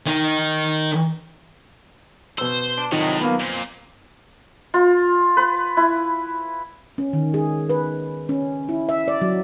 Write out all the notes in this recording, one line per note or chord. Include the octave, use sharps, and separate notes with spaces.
D#3 D#4
B2 C5 E6
D4
A2 C3 D#3 F3 F#3 D#5
F#3 A#3 B3
F2 A#2 C5
F4
B4
E4
C#4
D#3
G#4
B4
C#4
E4
E5
D5
F#3